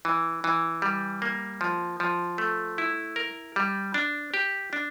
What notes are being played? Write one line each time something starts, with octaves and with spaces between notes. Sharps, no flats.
E3
E3
G3
A#3
F3
F3
A3
E4
A#4
G3
D4
G4
D4